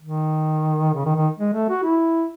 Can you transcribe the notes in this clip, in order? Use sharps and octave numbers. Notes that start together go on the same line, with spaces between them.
D#3
C#3
D#3
D#3
G#3
A3
F#4
E4